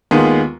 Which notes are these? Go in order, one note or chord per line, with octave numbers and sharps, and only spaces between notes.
D#2 D#3 G#3 B3 F4